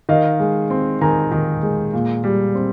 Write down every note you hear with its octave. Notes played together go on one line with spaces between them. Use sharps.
D#3 D#5 F5
G#3
C4
D#3 G#5 A#5
D#3
G#3
A#2
G3
C4